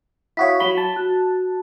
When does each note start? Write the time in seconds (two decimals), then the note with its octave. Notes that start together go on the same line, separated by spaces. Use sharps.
0.37 E4 F#4 C#5 F5 D#6 B6
0.60 F#3 B5 G7
0.78 A5
0.96 F#4 F#6